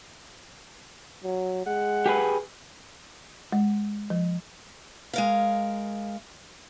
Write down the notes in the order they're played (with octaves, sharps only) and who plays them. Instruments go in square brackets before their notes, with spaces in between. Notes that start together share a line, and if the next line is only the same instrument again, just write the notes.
[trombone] F#3
[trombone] G#3 [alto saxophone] F#5
[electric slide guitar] G4 G#4 B4
[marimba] G#3
F3
[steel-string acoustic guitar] G#3 A#4 F5